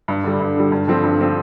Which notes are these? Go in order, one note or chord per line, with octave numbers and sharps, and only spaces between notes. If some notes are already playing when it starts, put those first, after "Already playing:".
G2
D3 G3
G2
D3 G3
G2
D3 F3 C4
G2
D3 F3 C4